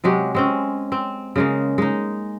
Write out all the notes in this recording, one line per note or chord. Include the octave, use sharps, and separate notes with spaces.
C3 F#3 G#3 G4
G#3 C4 C#4
C4
C#3 G#3 A#3
G#3 D#4